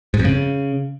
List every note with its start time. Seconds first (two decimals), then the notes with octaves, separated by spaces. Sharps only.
0.14 G#2
0.19 F2
0.25 C#3